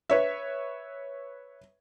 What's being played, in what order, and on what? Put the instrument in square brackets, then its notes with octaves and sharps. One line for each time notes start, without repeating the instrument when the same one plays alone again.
[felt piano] B4 C#5 E5